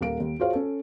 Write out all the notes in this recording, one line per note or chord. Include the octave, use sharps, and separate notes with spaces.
D#1 A#4 F5 D7
D#2
F4 F#4 G#4 C5 C#5 F5
C#4 A4